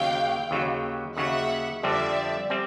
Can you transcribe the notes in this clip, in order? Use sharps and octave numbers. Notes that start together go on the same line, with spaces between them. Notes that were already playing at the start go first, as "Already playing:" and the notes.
Already playing: D#2 C#3 F#3 F5 G5
D#2 C#3 F#3
D#2 C#3 F#3 E5 F#5
F2 D3 G3 C4 D5 E5
G3 C4